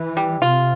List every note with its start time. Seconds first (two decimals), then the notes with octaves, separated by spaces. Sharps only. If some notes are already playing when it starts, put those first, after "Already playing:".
Already playing: E3
0.17 G3
0.41 C3 F4